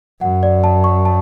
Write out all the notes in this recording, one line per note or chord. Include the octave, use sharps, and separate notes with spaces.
F#2 F#5
D5
A5
C#6
A5